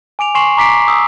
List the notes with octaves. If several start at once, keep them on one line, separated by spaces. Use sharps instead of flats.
G#5 D6 D7 F7
G#5 C6 C#6 C7 E7 F#7
A#5 D6 B6 C7 D7
D#6 E6